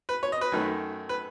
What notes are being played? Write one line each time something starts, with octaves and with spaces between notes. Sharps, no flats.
B4
C#5
D#5
B4
F#2 D#3 A3
B4